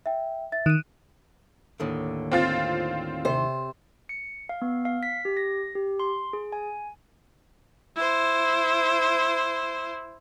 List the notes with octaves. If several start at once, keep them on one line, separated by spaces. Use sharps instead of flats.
E5 G5
E5 A6
D#3 F#6 D#7
D#2 A2 D3
C4 F4 A6
C3 C5
C#7
F5
B3
F5
B6
G4
A#6
G4
C6
G#4
G#5
E4 C5